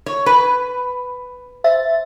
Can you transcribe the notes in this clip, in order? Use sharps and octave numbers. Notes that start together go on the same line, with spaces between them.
C#5
B4
C5 E5 A6